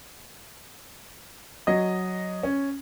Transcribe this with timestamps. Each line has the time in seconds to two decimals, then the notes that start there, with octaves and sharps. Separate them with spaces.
1.67 F#3 D#5
2.43 C#4